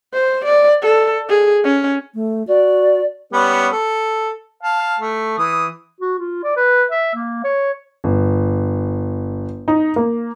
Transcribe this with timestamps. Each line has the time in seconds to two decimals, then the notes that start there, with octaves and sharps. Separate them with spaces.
0.13 C5
0.45 D5
0.82 A4
1.29 G#4
1.65 C#4
2.15 A3
2.47 F#4 D5
3.32 G3 B3 C#4
3.72 A4
4.63 F5 A5
5.00 A3
5.39 E3 D#6
6.01 F#4
6.19 F4
6.43 D5
6.56 B4
6.91 E5
7.15 A#3
7.44 C#5
8.04 G1
9.68 D#4
9.96 A#3